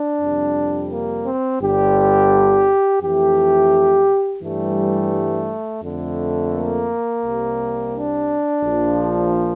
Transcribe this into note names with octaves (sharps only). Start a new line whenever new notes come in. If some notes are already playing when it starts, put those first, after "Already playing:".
Already playing: D4
F2 C3 G3
A#3
C4
G1 G2 D3 G3 G4
F2 E3 A3 G4
G2 E3 G3 A3
F2 D3 A3
A#3
C2 C3 G3
D4
A#1 A#2 F3